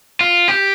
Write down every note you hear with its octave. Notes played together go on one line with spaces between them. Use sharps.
F4
G4